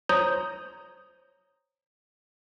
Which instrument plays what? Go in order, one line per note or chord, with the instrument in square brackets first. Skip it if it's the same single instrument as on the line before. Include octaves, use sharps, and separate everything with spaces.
[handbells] C5 C#5 A#5 D#6 G6